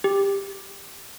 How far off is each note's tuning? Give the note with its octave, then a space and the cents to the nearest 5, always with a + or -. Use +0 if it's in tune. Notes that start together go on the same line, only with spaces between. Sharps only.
G4 +15